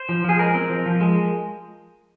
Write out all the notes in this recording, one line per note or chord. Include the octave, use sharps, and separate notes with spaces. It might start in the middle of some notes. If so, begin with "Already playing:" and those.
Already playing: C5
F3
F3 G#4
G#3 A#4
C4
F3
F3
G#3